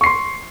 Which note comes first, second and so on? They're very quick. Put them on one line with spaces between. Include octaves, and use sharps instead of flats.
C#6 C7 C6